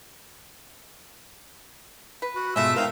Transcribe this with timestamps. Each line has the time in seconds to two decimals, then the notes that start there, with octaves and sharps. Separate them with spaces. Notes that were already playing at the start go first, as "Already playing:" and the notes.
2.22 B4
2.35 F#4
2.56 G#2 B2 G#3 A3 F4 E5 E6
2.76 C4 D#4 A#4 F5 G5